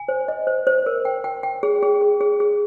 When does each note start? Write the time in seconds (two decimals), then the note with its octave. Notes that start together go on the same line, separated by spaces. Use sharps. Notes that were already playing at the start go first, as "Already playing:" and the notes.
Already playing: G#5
0.08 C5
0.28 D#5
0.47 C5
0.67 C5
0.86 A#4
1.05 G5
1.24 G5
1.43 G5
1.63 G#4
1.83 G#4
2.01 G#4
2.21 G#4
2.40 G#4